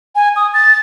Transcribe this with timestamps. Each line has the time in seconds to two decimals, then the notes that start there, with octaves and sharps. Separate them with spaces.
0.15 G#5
0.36 D#6
0.54 A6